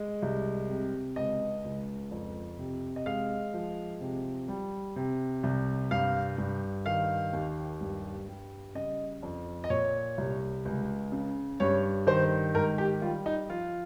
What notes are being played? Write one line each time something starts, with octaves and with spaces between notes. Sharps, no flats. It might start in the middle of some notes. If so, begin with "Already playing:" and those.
Already playing: G#3
C2
C3
C#2 D#5
C#2
F2
C3
D#5
G#3 F5
F3
C3
G3
C3
C2
G2 F5
G2
D#3 F5
D#2
G2
G3
C#3 D#5
F2
D#5
A#2 C#5
C2
C#2
C#3
G2 C#5
D#3 C5
G#2 A#4
G4
G3 F4
D#4
F3 F4